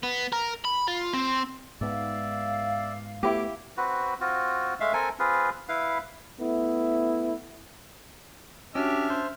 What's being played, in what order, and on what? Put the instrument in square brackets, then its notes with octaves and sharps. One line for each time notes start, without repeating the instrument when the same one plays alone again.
[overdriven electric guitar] B3
A#4
B5
F4
C4
[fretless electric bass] G#2 B3 [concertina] D5 E5 [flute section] F5
[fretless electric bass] A3 B3 [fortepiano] E4 G4 [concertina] D6
[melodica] C4 F#4 B4
C4 F4 F#4
G#3 A3 E5 F5
C4 A4 A#4 G#5
C4 F4 G#4 B4
E4 B4 F5
[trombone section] A3 B3 E4
[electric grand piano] C#4 F#4 [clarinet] D4 [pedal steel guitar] G4 [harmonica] E5 F6
[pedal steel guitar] C5